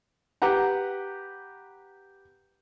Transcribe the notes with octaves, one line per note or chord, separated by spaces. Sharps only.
G4 B4 F#5 A#5